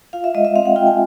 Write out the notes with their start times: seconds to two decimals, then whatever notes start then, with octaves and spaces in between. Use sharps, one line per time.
0.13 F4 F5
0.24 E5
0.34 G#3 D#5
0.45 E5
0.55 C4 F5
0.65 F#5
0.76 F4 G5
0.87 G#5